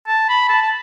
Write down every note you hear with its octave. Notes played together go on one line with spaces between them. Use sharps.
A5
B5
A5
A5